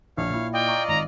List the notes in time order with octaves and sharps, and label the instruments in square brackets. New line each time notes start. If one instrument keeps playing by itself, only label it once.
[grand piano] A#1 [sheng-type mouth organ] C#5 F5
[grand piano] A#2 E4
[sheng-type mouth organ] F4 D5 D#5 [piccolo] G5
[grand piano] A#5 C#6
[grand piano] G#1 [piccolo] A#5